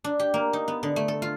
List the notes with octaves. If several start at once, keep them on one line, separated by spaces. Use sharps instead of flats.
D4
G4
A#3
D#4
B3
D3
A3
A4
F4